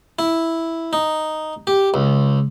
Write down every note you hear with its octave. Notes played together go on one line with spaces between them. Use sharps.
E4
D#4
G4
C#2